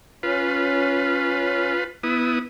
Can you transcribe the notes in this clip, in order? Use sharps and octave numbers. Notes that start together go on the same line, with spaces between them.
C#4 F4 B4
B3 E4 D#6